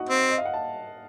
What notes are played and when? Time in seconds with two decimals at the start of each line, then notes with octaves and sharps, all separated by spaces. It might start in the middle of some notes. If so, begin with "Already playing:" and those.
Already playing: D#4 F#4 D#5 F#5
0.09 C4
0.30 D#5
0.38 F5
0.45 F#5
0.54 A5